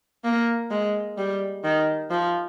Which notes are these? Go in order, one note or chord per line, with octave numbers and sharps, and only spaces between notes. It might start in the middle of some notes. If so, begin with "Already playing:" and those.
A#3
G#3
G3
D#3
F3